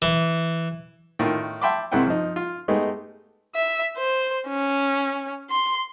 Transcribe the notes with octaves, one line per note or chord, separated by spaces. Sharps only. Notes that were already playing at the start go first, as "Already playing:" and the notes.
E3
A2 D#3 F4 G5
E5 G5 A5 B5 C6 D6
C2 G#3 C4 E4 F#5 G5
F3 D#4
F4
G#3 A3 B3 D#4 G4 G#4
E5
C5
C#4
C6